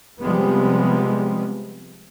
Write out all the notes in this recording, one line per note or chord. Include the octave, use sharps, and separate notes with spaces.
C3 F3 G3 G#3 B3